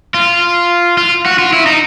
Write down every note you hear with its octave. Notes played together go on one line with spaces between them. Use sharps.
F4
F4
F#4
F4
E4
D#4